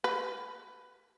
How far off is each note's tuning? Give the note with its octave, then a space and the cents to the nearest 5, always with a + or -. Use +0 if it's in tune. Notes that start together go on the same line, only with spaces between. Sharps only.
B4 +15